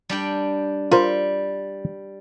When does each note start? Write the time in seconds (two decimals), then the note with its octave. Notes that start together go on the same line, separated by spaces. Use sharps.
0.09 G3 D4 G5
0.91 G3 F4 A#4 C5